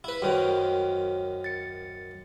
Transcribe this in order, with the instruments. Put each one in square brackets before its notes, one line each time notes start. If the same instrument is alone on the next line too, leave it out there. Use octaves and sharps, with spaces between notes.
[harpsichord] E4 B4
[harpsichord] F#2 D#3 [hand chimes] F#4 C5 C#5
[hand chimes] A6 C#7